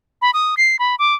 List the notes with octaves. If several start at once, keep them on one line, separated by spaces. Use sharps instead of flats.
B5
D#6
C7
B5
D6